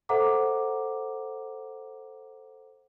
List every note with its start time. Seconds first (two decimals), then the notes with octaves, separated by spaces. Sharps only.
0.09 A4 C5 E5 F#5 A#5 D6